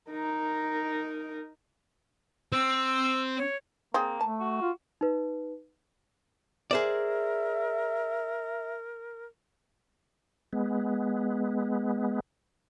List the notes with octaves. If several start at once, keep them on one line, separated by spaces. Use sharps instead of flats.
D#4 A#4
C4 E6
C#5
A#3 C4 G#4
A3 A5
F#4
F4
D#4 B4
G#4 A#4 C5 D5 E5
G#3 B3